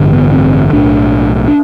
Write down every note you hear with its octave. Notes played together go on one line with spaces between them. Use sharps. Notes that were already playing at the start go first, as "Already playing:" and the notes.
Already playing: A1 G2 D3
B3
C4
B1 A2 D4
D4